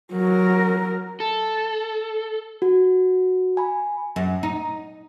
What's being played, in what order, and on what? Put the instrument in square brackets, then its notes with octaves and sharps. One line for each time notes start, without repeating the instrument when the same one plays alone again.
[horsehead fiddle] F#3 A#4
[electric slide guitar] A4
[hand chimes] F#4
G#5 B5
[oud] F#2
D#4